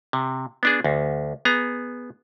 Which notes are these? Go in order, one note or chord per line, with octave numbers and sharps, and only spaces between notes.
C3
B3 D4 G#4
D2
B3 G#4 A#5